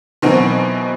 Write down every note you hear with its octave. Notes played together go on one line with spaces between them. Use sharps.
B2 D#3 E3 F#3 C4